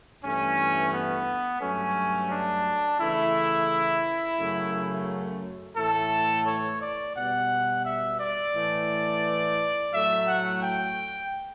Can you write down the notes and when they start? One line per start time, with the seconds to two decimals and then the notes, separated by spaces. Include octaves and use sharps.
0.24 G2 E3 A3 C#4
0.92 B3
1.61 G2 F#3 A3 C#4
2.31 D4
3.00 C#3 E3 A3 E4
4.39 F#2 C#3 F#3 A3
5.76 A2 E3 A3 A4
6.46 C#5
6.81 D5
7.15 B2 G3 F#5
7.85 E5
8.19 D5
8.54 A2 E3 A3
9.92 A2 F#3 A3 E5
10.28 F#5
10.62 G5